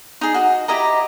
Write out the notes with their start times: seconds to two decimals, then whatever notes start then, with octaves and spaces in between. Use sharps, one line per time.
0.21 D#4 G#4
0.34 F#4 D#5
0.68 E4 G4 D#5 A#5